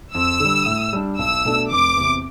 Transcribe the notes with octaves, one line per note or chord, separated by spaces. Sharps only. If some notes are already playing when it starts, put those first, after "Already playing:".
F2 E6
D3 G3
A2
G3 D4
B1 E6
B2 A3 D4
F1 D6
E2 C3